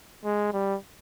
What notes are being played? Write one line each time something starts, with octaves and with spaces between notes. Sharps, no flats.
G#3
G3